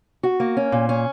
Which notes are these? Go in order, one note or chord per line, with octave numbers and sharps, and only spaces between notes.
F#4
A#3
C#4
A#2
C#4